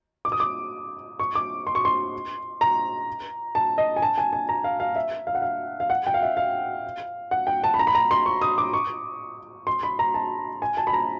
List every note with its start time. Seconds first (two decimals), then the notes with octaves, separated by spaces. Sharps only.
0.25 D6
0.32 D#6
0.40 D6
1.20 C#6
1.35 D6
1.67 C6
1.75 C#6
1.85 C6
2.61 A#5
3.55 A5
3.78 D#5
3.96 G#5
4.02 A5
4.18 G#5
4.33 G#5
4.49 A#5
4.64 F5
4.80 F5
4.96 E5
5.27 F5
5.35 F#5
5.42 F5
5.80 F5
5.90 F#5
6.07 G5
6.14 F5
6.22 E5
6.37 F5
7.31 F#5
7.47 G5
7.64 A5
7.74 B5
7.79 A#5
7.87 B5
7.95 A#5
8.11 C6
8.26 C#6
8.41 D#6
8.58 D6
8.73 C#6
9.67 C6
9.83 B5
9.99 A#5
10.14 A5
10.62 G#5
10.77 A5
10.87 B5
10.93 A#5